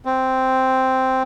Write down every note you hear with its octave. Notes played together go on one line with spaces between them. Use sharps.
C4